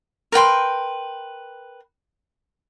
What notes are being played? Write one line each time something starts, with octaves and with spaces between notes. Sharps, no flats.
A#4 B4 G5 C6